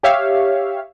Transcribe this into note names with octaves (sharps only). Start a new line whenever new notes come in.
G4 C#5 E5 F5